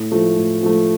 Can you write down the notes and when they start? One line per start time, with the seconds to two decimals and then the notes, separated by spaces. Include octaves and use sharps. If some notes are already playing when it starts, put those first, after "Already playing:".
Already playing: A2
0.12 F3 A3
0.37 A2
0.63 F3 A3